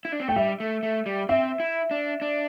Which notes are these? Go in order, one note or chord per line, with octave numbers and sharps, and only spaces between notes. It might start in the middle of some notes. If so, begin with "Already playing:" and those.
E4
D4
C4
A3 G5
G3 E5
A3
A3
G3
C4 E5
E4
D4
D4